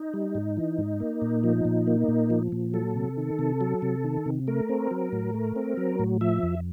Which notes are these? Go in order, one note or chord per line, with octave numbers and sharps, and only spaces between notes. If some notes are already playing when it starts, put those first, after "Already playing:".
Already playing: D#4
G3
G#2
E3
G#2
A#3
A#2
F3
A#2
A#3
A#2
F3
A#2
F#3 A4
C3
D#3
C3
F#3
C3
D#3
C3
A3 A#4
C4
F#3
A2
A3
C4
F#3
A2
F3 E5
F2